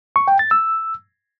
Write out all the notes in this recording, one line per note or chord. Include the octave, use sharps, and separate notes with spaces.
C#6
G5
A6
E6